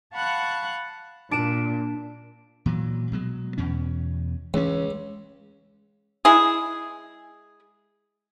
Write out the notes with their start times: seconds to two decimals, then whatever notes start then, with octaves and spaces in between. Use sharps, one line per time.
0.15 F5 F#5 A5 B5 C#6 F#6
1.31 A#2 D4 D7 E7
2.66 A#2 E3 F#3
3.12 B2 F#3 G#3
3.58 E2 B2 C#4
4.54 C#2 E3 C#4
6.25 G#3 E4 G#4